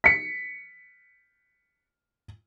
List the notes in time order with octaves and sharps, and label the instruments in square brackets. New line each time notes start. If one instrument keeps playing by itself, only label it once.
[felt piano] B6 C#7